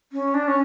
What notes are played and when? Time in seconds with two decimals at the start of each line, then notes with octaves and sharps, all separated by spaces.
0.12 C#4
0.34 D4
0.48 C#4